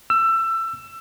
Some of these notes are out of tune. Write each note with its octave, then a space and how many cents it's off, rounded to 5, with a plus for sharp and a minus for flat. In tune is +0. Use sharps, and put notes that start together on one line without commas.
E6 +20